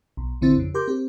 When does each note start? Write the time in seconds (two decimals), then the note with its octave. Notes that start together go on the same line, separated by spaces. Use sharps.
0.17 B1
0.41 A1 D3 C4 E4 A6
0.57 F2 C#3
0.74 G4 A#4 C6 D6 G6
0.88 C4 G4